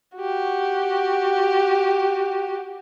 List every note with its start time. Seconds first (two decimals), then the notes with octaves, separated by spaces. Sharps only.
0.17 F#4 G4